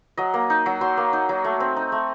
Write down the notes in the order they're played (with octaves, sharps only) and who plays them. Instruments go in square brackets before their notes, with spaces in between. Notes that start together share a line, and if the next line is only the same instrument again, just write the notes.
[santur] F#3 D#5
A#3
D#4
F#3
F#3 C6
A#3
D#4
F#3
A3
C4
D#4
A3